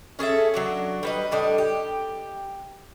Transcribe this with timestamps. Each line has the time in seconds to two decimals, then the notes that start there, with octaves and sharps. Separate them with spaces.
0.19 C#4 G#4 A4 E5
0.54 F#3 D4 F#4
1.03 G3 B4 D#5
1.31 A2 G3 D4 D#5
1.58 G4